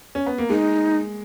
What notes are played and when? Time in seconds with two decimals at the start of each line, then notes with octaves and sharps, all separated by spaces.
0.15 C#4
0.26 B3
0.38 A#3
0.50 G#3 D#4